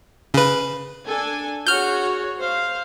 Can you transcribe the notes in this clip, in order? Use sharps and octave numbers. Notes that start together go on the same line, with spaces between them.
C#3 B4
D4 A4 G#5
F#4 G#4 C#5 F6 G6
C5 F5